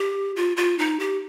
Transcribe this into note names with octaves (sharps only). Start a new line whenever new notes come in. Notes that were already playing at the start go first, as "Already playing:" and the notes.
Already playing: G4
F4
F4
D#4
G4